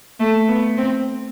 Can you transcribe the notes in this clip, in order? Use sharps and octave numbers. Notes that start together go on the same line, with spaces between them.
A3
B3
C4